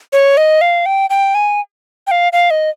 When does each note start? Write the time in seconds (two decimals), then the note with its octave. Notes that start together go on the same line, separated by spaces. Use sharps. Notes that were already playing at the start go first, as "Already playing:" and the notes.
0.13 C#5
0.37 D#5
0.61 F5
0.86 G5
1.10 G5
1.35 G#5
2.07 G5
2.11 F5
2.33 F5
2.51 D#5